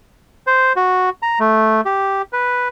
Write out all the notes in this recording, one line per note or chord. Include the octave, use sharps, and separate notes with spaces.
C5
F#4
A#5
A3
G4
B4